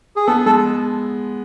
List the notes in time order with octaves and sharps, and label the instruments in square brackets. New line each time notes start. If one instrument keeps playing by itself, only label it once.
[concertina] G#4
[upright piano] B3 [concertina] A4
[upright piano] G#3 [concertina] A4